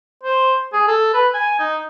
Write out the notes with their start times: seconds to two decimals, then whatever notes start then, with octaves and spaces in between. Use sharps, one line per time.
0.23 C5
0.73 G#4
0.88 A4
1.14 B4
1.34 G#5
1.59 D#4